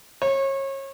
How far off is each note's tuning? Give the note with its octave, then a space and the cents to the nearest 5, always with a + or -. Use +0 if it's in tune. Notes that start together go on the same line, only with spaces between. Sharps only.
C#5 -30